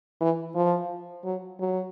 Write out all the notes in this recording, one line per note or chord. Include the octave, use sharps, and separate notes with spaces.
E3
F3
F#3
F#3